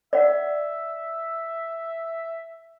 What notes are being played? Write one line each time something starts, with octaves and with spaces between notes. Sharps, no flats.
D5 E5 F#5